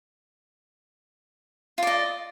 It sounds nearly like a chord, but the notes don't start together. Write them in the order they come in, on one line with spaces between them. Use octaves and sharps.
F4 D5 D#5